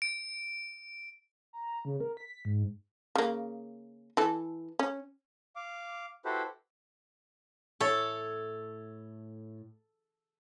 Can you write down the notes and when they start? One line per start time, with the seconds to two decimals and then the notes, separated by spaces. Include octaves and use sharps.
0.02 D7
1.53 A#5
1.85 C#3
2.00 A#4
2.17 B6
2.45 G#2
3.16 C#3 A#3
4.17 E3 A4
4.79 C#4
5.56 F5 D6
6.25 E4 F#4 G4 A4 B4 C5
7.80 A2 A4 C#5 E5